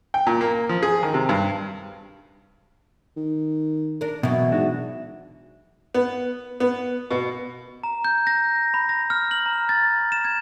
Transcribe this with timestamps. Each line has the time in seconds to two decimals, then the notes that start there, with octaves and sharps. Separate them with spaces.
0.14 G5
0.27 A#2
0.41 A#3
0.69 F3
0.83 G#4
1.03 D#3
1.14 C3
1.29 G2
3.17 D#3
4.01 D4 A#4
4.23 B2 E3 F#3
4.52 G#2 D4 F#4
5.94 B3
6.60 B3
7.11 B2
7.84 A#5
8.05 G6
8.27 A#6
8.74 B5
8.89 A#6
9.10 F6
9.31 F#7
9.46 A#5
9.69 A6
10.12 E7
10.25 G#6